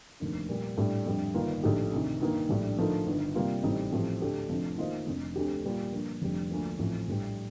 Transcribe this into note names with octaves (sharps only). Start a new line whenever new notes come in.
F1 D#2 D3
A#2 G3 A#3
A2 G3 D4
F2 D3 G3
G1 G2 D#3 A#3 F4
A#1 A2 A3 D#4 G4
D2 C3 D#3
G2 D#3 A#3
A#1 A2 G3 D4
D3 F3 A3 D#4 A#4
G1 G2 D#3
C3 G3 A#3 F4
A1 A2 G3 C4 D#4
A1 A2 F3 C4 G4
D2 D3 A3 D4 G4
F1 F2 D3 F3
D#3 A#3 F4 C5 D#5
F1 F2 D3
D2 D3 A3 C4 G4
A#2 G3 A#3 F4
G2 D3 F3 A#3
F1 F2 D3 G3
D2 D3 F3 A#3
A1 A2 F3 C4
A#1 A2 G3